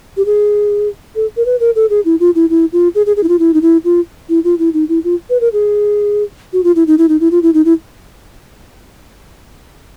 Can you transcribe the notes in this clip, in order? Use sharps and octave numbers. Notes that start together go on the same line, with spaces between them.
G4
G#4
A4
A#4
B4
A#4
A4
G#4
E4
F4
E4
E4
F4
G#4
G#4
G#4
E4
F4
E4
D#4
E4
F4
E4
F4
E4
D#4
E4
F4
B4
A#4
G#4
F#4
F4
E4
D#4
E4
D#4
E4
F4
E4
D#4
E4